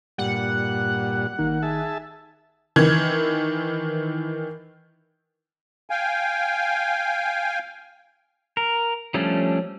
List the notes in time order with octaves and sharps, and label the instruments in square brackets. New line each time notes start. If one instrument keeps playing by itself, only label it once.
[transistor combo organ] G2 A#2 G3 [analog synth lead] F#5
[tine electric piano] A1 D#3 D#4 [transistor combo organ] A#3
[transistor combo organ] G#4 E5 A5
[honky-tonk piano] D#3 E3 G#6
[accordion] F5 G5 G#5
[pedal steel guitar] A#4
F3 G3 A3 C#4 D4